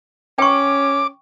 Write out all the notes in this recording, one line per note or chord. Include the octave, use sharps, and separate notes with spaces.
C#4 G5 C#6 D6